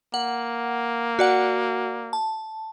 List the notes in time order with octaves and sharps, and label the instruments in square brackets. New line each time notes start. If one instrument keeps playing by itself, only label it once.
[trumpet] A#3 [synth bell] F#5
[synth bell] F#4 D5 F#5
A5